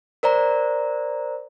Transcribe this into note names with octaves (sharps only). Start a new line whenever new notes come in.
A#4 C5 D5 A#5